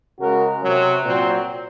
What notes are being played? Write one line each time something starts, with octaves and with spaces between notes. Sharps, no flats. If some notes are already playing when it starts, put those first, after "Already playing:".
C#3 G#3 F#4 A#4
C3 F#3
A#2 F#3 C4